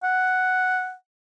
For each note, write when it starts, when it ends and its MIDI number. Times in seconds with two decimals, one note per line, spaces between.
0.04 0.94 78